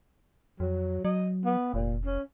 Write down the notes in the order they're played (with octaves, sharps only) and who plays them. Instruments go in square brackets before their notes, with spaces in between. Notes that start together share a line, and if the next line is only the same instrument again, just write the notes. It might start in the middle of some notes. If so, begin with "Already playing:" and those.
[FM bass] F2 [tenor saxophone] F#3
[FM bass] F#3 [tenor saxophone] D#5
[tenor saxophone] B3
[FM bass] F1 [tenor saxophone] A#2
[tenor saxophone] C#4